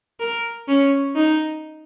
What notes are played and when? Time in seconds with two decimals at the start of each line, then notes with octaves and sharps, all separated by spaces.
0.20 A#4
0.68 C#4
1.16 D#4